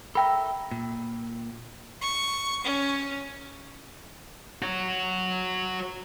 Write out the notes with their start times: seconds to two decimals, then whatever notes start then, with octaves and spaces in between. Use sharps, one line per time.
0.15 A4 A#4 E5 G5 B5
0.72 A#2
2.01 C#6
2.64 C#4
4.62 F#4 C#5